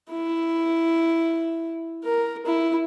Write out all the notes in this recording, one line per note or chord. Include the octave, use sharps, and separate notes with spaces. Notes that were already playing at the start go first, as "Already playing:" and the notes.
E4
A#4
E4